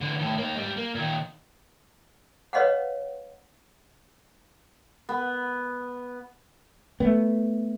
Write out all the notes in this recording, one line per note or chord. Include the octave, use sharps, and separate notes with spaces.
D3 E3
A2 D#3
A#3 D#4
G#2 G3
A#3
A#2 D#3
B4 C#5 D#5 F5 F#5
B3
A3 B3